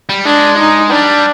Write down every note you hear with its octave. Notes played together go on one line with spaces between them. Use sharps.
G3
G#3 D4
D#4
G3 D4